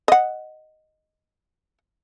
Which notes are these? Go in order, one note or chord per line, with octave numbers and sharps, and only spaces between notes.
D#5 F#5